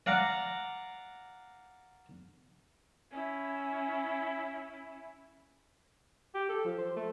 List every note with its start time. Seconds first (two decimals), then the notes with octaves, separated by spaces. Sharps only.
0.06 D5 F5 F#5 A#5 D6
3.11 C#4 E4
6.34 G4
6.49 A4
6.64 F3
6.78 C5
6.96 A3